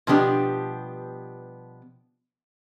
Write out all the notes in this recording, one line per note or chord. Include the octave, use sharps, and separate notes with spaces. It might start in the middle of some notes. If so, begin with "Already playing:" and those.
B2 F3 G3 B3 D4 G4